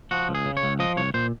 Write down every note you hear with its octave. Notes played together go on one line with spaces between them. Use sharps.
F3 F#4
C#2
G#4
C#3
C#5
C#2
F3 D#5
C2 C#5
A#2 C5